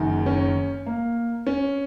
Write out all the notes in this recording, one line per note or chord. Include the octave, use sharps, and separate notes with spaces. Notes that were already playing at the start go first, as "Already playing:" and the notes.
Already playing: F#1 F#2 D#3
C#4
A#3
C#4